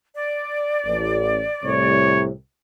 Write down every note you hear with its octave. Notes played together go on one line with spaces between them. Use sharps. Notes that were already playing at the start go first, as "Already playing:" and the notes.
D5
A1
C2 A2 C3 C#5